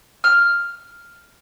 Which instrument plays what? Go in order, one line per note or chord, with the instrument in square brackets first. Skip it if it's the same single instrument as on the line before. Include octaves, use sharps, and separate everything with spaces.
[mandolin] F6